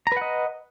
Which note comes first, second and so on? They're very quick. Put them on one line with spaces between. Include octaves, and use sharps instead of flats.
A#5 B4 F#5 D#5